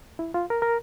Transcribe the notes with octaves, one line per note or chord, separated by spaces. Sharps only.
E4
F4
A#4
A#4